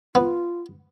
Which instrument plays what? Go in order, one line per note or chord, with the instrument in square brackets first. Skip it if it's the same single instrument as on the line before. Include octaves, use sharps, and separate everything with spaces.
[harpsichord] B3 [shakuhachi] F4